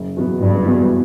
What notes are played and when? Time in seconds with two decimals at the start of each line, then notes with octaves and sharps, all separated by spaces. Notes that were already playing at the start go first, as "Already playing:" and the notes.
Already playing: F#1
0.16 E2 B2 F#3 B3
0.41 F#1 G2
0.66 E2 B2 F#3 B3